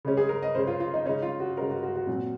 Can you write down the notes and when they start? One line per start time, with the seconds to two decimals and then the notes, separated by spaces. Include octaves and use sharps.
0.05 C#3 G#3 C#4
0.17 G#4
0.29 A#4
0.42 D#5
0.55 C#3 G#3 C#4 C5
0.67 F4
0.80 F4
0.94 D#4
1.05 C#3 G#3 C#4 D#4
1.22 F4
1.40 F#4
1.57 C#3 G#3 C#4 A#4
1.70 F#4
1.83 F#4
1.95 F#4
2.07 A#2 F#3 C4